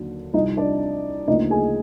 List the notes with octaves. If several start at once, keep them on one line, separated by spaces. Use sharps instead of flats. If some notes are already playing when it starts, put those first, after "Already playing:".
Already playing: D#2 D3 F#3
C2 C3 F3 D#4 D#5
D4 D5
D2 C#3 F3 A#3 D#4 D#5
G#4 G#5